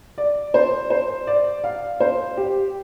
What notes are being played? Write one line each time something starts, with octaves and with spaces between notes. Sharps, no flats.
D5
C5
C5
D5
F5
C5
G4